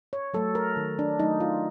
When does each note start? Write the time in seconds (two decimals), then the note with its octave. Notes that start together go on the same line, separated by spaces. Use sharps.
0.13 C#5
0.34 F#3 A3 A4
0.55 A#4
0.77 D#3
0.99 D4
1.19 F#3 A3 D#4
1.40 F4